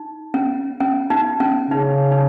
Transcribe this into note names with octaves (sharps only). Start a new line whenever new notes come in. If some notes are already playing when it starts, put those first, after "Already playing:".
Already playing: D#4
C#4
C#4
D#4
C#4
C#3 D#4
D#4